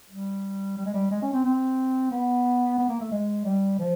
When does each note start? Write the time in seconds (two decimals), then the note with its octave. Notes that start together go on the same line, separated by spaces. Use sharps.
0.10 G3
0.77 G3
0.86 G#3
0.94 G3
1.11 G#3
1.22 C#4
1.33 C4
1.44 C4
2.11 B3
2.78 B3
2.89 A#3
3.01 A3
3.11 G#3
3.45 G3
3.79 F3